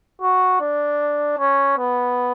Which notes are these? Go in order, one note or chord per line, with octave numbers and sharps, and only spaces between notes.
F#4
D4
C#4
B3